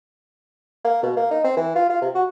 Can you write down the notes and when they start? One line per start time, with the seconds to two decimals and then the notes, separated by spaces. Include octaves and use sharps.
0.84 A#3
1.03 B2
1.17 A#3
1.31 D#4
1.44 C4
1.57 E3
1.76 F4
1.90 F4
2.02 C3
2.15 F#4